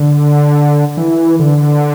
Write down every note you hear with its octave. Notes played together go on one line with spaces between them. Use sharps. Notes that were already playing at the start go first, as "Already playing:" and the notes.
Already playing: D3
E3
D3